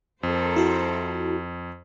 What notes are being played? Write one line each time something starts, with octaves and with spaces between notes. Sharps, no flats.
F2 A4 A#4 C5
E4 F#4